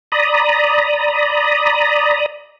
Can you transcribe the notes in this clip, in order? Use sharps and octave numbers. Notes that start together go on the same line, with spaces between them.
D5 A#5 B5 D#6